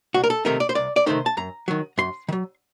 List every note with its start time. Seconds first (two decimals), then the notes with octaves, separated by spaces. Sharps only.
0.14 C2 F#4
0.24 A#4
0.30 A4
0.45 C3 D#3 A3 D#4 A#4
0.60 D5
0.69 C5
0.75 C2 D5
0.96 D5
1.06 C3 D#3 A3 D#4 C5
1.26 A5
1.37 F#2 A#5
1.68 D#3 F#3
1.98 F#2 C6
2.28 D#3
2.32 F#3